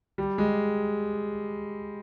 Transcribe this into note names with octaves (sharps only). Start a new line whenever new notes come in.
G3
G#3